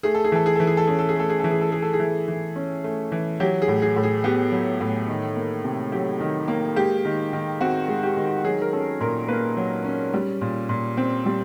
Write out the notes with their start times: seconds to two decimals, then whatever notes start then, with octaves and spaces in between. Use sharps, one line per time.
0.03 A3 G#4
0.15 A4
0.24 G#4
0.32 E3 A4
0.46 G#4
0.56 E3 A4
0.67 G#4
0.77 A4
0.87 C#4 G#4
0.99 A4
1.09 G#4
1.16 A3 A4
1.30 G#4
1.40 E3 A4
1.51 G#4
1.61 A4
1.72 A3 G#4
1.82 A4
1.93 G#4
2.00 E3
2.28 E3
2.56 C#4
2.84 A3
3.12 E3
3.40 F#3 G4
3.62 G#4
3.68 A2
3.82 G#4
3.96 A2
4.03 G#4
4.24 B3 G4
4.52 F#3
4.81 A2
5.08 D#3
5.36 A#3
5.64 C3
5.92 F#3 G4
6.20 D#3
6.48 A#3
6.76 G#3 G4
7.05 D#3
7.33 D#3
7.61 C4 F#4
7.88 G#3
8.03 G4
8.17 D#3
8.44 F#3 G#4
8.62 A#4
8.73 C#4 A4
9.00 A#2 A#4
9.28 A#3 B4
9.57 F#3
9.85 C#4
10.14 G3
10.41 A#2
10.69 A#2
10.97 C4
11.26 G3